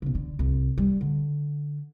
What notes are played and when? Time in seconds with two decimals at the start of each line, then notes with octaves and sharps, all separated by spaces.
0.02 B1 C#3
0.15 D3
0.39 C2
0.78 G3
1.01 D3